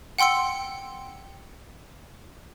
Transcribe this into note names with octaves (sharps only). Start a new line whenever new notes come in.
F#5 G5 C6 E6 C#7